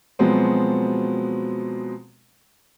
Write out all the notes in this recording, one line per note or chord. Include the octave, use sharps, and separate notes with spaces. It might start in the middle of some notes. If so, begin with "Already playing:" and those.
B2 F3 F#3 G#3 B3 C4